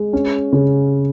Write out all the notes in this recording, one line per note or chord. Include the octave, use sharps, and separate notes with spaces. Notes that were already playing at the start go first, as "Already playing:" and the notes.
Already playing: G#3
C#4
C#3